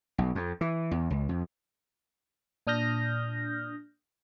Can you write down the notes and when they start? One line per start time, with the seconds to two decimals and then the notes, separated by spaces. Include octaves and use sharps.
0.18 B1
0.35 F2
0.61 E3
0.91 E2
1.10 C#2
1.29 F2
2.67 A#2 D4 D#6 F6 G6 A#6